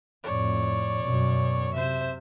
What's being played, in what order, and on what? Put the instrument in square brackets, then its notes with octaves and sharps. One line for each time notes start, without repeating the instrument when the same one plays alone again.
[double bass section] F2 A2 [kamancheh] C#5 D5
[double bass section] F#2 B2
[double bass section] C3 [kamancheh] C5 E5